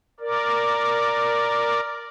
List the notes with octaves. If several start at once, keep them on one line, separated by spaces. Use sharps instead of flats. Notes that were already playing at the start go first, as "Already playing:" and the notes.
A#4 D5